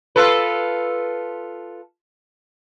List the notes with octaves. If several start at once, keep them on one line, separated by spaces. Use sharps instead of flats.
F4 A4 B4